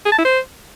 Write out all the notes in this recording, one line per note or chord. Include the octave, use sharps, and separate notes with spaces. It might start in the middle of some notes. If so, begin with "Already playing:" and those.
G#4
A5
E4
C5